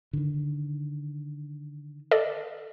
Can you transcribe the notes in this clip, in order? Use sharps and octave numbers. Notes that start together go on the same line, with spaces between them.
D3 D#3
A4 D5 D#5